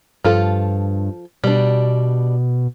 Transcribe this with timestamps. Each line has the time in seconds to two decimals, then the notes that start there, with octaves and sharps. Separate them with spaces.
0.24 G2 F3 F4 A4
1.44 B2 G3 D4